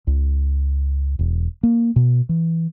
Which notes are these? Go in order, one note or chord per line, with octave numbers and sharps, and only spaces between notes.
C#2
E1
A#3
B2
E3